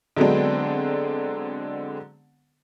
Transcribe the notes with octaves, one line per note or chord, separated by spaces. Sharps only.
D3 F#3 G#3 B3 C4 D4